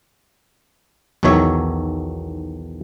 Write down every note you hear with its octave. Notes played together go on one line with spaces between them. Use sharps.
B1 E2 D#3 F#3 C#5 E5